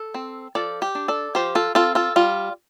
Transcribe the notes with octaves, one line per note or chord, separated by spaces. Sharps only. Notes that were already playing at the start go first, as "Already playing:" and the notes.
Already playing: A4
C4
F3 A4 D5
G4
D4
A4 D5
F3 G4 C5
F4 A4
C4 F4 A4
F4 A4
G3 F4